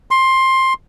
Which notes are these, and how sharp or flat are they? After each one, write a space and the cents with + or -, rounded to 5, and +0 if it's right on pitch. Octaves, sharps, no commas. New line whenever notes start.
C6 +15